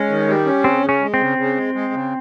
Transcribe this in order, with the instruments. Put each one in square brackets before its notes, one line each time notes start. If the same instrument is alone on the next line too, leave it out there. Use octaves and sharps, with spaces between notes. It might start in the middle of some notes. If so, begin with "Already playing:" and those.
Already playing: [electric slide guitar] G#3 [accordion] C#4
[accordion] D#3
G3
C#4
[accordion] C#3 [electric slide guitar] C4
[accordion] C#3
[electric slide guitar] C#4
[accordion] G#3
[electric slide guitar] C4
[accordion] C#3
C#3
G#3
G#3
C#3